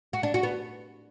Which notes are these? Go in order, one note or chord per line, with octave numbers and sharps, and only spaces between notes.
F#4
D4
F#4
B3